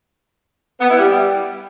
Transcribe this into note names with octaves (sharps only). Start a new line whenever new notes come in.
B3
E4
G3